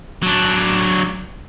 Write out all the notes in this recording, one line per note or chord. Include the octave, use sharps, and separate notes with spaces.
F#3 D4